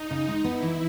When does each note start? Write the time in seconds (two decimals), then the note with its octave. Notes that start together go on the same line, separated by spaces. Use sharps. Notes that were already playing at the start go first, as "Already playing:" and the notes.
Already playing: D#4
0.11 C#3
0.28 G#3
0.44 B3 E4
0.62 E3